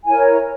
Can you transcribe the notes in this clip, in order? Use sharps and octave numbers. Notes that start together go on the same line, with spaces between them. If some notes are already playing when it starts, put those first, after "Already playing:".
E4 A#4 C#5 G#5